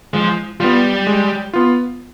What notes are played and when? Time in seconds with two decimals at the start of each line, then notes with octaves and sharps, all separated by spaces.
0.13 F3 G#3
0.60 G3 B3 F4
1.07 G#3
1.53 B3 F4